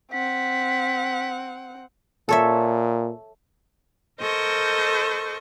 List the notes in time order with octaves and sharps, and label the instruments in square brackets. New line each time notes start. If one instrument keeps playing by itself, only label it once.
[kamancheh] C4 F#5 [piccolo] B6
[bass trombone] A#2 [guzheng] A4 C#5 E5
[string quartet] A4 A#4 C5 D#5 C#6